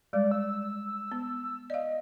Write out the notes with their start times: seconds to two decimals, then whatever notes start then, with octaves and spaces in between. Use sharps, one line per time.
0.13 G3 G#3 D5
0.31 E6
1.12 B3
1.70 D5 D#5 F5